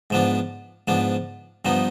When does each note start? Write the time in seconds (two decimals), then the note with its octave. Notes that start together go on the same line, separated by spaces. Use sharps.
0.10 G#2 F3 B3 D4
0.88 G#2 F3 B3 D4
1.65 G2 F3 B3 D#4